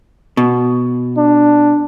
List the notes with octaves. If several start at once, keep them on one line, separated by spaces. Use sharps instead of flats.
B2
D4